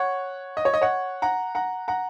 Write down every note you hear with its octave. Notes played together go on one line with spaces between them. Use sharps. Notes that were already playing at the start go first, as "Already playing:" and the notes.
Already playing: C#5 F#5
D#5
C#5
D#5
C#5 F#5
F#5 A#5
F#5 A#5
F#5 A#5